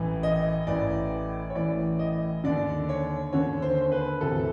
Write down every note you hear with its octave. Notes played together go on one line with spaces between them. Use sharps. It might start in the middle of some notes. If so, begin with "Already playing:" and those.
Already playing: A1 A2 E3
D#5
A1 A2 E3 D5
C#5
A1 A2 E3 D5
D#5
D#2 D3 D5
C#5
D#2 D3 C#5
C5
C5
B4
D2 C3 E3 A4